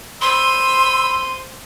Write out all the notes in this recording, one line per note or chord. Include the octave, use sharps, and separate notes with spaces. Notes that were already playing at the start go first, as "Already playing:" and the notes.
C5 B5 C6 E6 D#7